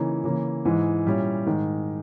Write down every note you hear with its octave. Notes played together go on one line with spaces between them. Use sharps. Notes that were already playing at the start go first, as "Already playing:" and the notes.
Already playing: C#3 E3 A#3 D#4
C#3 E3 A#3
G#2 E3 G#3
A#2 G3 C#4 E4
G#2 D#3 G#3